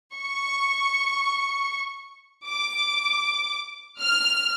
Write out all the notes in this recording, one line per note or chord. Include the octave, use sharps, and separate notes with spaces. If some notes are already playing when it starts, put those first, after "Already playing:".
C#6
D6
F6